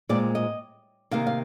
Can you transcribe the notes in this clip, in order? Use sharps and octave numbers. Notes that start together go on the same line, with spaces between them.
A#2 G#3 C4 D5
D#5
C3 D#3 A#3 F5
F5